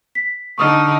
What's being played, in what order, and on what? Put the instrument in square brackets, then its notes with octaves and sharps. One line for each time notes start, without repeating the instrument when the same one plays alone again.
[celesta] B6
[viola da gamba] D3 D#4 [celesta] C#6 D#6 F6